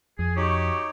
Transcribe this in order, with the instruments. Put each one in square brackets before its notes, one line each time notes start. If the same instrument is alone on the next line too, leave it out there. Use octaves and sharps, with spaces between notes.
[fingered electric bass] F2 [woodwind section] G#4
[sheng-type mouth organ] D#4 C#5 [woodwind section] F#4 G4 C#6